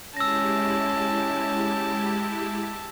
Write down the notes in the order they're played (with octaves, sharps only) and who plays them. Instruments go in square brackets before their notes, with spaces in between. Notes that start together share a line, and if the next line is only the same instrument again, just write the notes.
[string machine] G#3 E4 G4 [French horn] C#4 [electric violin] A5 [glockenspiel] E6 A#6